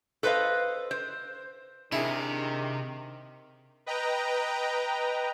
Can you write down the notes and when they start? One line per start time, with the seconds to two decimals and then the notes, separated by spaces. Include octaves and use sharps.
0.23 A4 B4 C5 D#5 F5
0.91 C5
1.92 C3 D#3 D4 E4 G#4
3.86 B4 D#5 G5 A#5